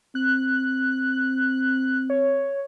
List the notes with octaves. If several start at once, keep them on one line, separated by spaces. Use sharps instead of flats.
C4 F#6
C#5